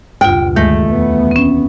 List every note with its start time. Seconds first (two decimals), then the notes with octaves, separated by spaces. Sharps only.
0.21 F#1 D2 G2 B2 F4 G5
0.56 D2 G2 D#3 G#3 A3 A#6
0.90 E2 B3
1.31 C4 C#4